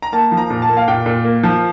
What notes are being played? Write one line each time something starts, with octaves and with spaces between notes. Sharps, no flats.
A#5
A#3 A5
F3
A#5
A#2
A5
A#3
F5
A#2 G5
A#2
A#3
F3